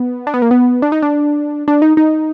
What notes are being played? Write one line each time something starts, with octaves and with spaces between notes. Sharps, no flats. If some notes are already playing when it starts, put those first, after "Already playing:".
Already playing: B3
D4
B3
A#3
B3
D4
D#4
D4
D4
D#4
D#4